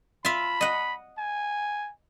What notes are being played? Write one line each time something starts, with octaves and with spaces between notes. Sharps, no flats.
F4 E5 B5
D#5 F#5
G#5